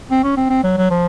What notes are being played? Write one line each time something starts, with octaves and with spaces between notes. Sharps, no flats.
C4
C#4
C4
C4
F#3
F#3
F3